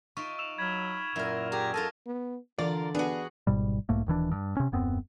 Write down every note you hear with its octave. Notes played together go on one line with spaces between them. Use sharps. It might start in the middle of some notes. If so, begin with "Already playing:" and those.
D#4 F4 E5 C#6 D7
E6 E7 F7
F#3 B5 F6 G#6
F#2 A#2 E4 A#4
G4 G#4 A#5
F4 A4 A#4 D#5 A5
B3
D3 E3 F4 A#4 D5
B3 D4 F#4 G#4
G#1 G#2 B2 G3
B1 G#2 A3 A#3
D#1 D#3 E3 D4
G2
C3 C#4
D#1 F#2 B3 C4